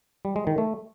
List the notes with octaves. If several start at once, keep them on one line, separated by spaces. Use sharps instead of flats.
G3
G#3
D#3
A3